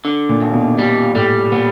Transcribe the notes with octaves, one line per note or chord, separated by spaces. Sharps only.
D3
A#2
D#2
B2
B2 G3
A2 G3
A#2 B3